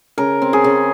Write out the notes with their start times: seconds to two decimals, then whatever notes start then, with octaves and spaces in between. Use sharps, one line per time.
0.18 C#3 A#4
0.42 C4
0.53 G#4
0.64 C#3